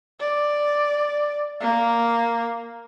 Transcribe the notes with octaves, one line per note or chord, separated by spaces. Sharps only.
D5
A#3